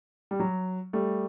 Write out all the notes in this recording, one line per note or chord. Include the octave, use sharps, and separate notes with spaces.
G3
F#3
G3 A3